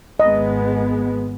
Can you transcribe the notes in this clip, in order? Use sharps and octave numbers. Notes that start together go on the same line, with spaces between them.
G#1 G#3 B3 D#5